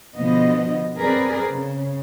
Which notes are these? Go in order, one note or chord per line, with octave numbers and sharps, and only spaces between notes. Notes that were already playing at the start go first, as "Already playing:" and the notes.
B2 D3 F3 B3 D#5
C4 G#4 A#4 B4 D5
C#3